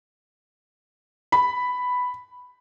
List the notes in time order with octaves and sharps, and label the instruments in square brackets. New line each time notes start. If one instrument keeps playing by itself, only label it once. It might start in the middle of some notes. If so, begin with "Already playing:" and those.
[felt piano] B5